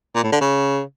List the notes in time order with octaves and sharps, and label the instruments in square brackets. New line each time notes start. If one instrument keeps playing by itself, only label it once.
[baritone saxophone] A#2
A2
D3
C#3